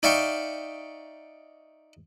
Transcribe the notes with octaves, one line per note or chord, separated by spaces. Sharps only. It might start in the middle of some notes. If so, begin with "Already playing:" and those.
D#4 D5 E5 F5 G5 C#6